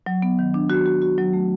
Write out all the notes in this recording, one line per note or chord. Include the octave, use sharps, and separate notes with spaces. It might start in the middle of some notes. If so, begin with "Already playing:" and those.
F#3
B3
D#3
D4
F#4
F#4
F#4
F#3
A3